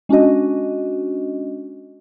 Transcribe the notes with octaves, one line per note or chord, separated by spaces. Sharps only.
G#3 C#4 D4 F#4 D#5